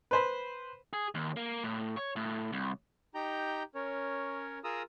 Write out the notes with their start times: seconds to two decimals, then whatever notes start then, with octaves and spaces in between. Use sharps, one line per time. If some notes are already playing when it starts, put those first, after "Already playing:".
0.11 B4 C5 B5
0.93 G#4
1.15 D#2
1.36 A#3
1.64 A2
1.96 C#5
2.16 A2
2.52 C2
3.15 D#4 G4 G5 A#5 G6
3.75 C#4 A#4 C#5
4.64 F4 G#4 A#4 A#5 D#6 E6